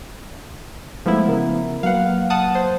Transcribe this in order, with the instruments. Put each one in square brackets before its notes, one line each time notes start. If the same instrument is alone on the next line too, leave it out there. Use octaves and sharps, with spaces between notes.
[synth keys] F3 B3 E4 [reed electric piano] G#3 A3
[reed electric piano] C#3 A#4
[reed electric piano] F#3 A#3 B4 [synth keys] F5 F#5
[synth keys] F#5 A5 D#6
C5